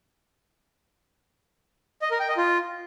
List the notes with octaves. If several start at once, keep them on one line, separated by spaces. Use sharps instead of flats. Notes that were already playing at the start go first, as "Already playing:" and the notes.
D#5
A#4
G5
D#5
F4